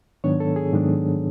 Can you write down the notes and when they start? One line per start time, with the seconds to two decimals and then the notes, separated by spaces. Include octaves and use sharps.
0.24 G#2 D#3 F#3 B3 D4 C#5
0.40 A4
0.56 G#4
0.73 G#2 D#3 F#3 B3 D4